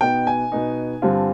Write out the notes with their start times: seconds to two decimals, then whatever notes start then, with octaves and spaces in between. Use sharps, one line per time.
0.01 B2 B3 D#4 G5
0.27 G#5
0.52 B2 B3 D#4
1.02 G2 D3 G3 C4 F4